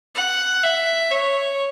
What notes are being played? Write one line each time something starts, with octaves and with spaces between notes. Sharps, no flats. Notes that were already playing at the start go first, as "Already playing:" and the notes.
F#5
E5
C#5